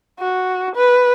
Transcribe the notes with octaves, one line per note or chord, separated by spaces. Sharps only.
F#4
B4